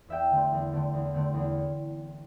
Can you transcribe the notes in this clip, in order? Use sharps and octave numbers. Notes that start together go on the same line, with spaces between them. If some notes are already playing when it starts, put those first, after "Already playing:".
E2 E5 G5
D3 A3 C4
E2
D3 A3 C4
E2
D3 A3 C4
E2